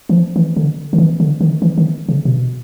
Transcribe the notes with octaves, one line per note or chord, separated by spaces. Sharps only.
E3
F3
E3
D3
D#3
E3
D3
D#3
E3
D#3
C#3
B2